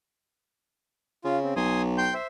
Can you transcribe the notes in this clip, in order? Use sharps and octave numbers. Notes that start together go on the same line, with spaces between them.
C#3 F4
C4
B1 G#5 C6 D#6
G5 C6 G6
C5 E5